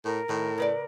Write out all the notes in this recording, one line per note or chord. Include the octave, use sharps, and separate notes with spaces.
A2 A#4
A2 D#3
C#3 B4 D5